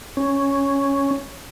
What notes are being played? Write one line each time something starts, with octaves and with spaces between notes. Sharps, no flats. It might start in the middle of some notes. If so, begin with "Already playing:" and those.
C#4